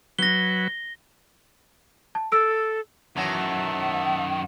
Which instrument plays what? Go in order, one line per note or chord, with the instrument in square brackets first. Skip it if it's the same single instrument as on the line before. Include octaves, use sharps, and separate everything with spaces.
[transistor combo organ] F#3 B4 [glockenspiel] A#6 G7
[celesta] A5
[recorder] A4 [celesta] E6 D7
[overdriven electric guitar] F#2 D#3 [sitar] E3 F#3 [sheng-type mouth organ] E5 A5 [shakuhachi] F#5